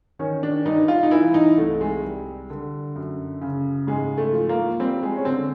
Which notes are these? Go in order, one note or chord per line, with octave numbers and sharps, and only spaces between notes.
D#3 C#4
D4
G2 D#4
F4
D#4
E3 E4
D#4
C2 A3
G#3
G3
D3
F#2
C#3
G#2 G#3
A3
F3
A#3
G3 C4
G#3
C#4
D3 C4